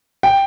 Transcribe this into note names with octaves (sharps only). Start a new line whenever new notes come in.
G5